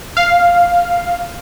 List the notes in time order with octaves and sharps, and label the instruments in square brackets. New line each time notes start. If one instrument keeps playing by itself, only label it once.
[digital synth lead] F5